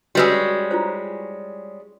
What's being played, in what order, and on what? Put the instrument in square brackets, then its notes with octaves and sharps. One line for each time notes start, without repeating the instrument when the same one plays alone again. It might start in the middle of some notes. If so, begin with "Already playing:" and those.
[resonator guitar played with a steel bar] G3 G#3 C#4 [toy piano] F#4 B4 E6
[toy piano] E4 F4 C5